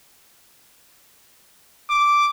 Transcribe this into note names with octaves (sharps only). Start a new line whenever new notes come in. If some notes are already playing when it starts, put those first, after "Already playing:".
D6